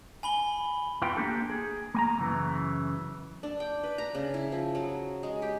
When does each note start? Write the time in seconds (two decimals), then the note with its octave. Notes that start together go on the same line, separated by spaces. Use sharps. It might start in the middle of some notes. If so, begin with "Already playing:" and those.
0.23 G#5 B5 G7
1.02 E2 E3 F4 G5
1.16 A#3 D4 G4 A4
1.50 G#4
1.94 A#3 G#5 A#5
2.18 F#2 C#3 E3
3.43 D4
3.60 G5
3.83 B4
3.98 A#5
4.15 C#3
4.34 E4
4.52 F3
4.75 F#3
5.23 G#3
5.42 G4